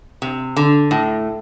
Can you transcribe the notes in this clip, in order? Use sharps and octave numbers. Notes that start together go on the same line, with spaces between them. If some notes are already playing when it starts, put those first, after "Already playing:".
C3
D3
A2